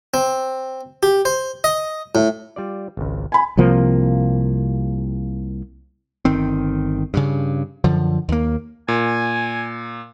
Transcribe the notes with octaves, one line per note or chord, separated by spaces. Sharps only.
C4
G4
C5
D#5
A2
G3 F4 D5
G#1 C#2
G#5 B5
C2 C3 F3 A#3
G1 D#3 C4
G2 C#3
F#2 D3 F3
D#2 A#3
A#2 G#5